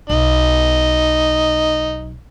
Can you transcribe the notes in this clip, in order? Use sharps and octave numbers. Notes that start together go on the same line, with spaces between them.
B1 D#4